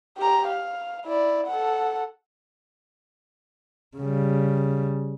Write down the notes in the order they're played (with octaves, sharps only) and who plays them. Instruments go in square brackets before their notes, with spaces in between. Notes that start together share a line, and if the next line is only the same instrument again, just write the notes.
[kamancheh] G4 A#5
F5
E4 D5
A4 F#5
[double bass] C#3 G3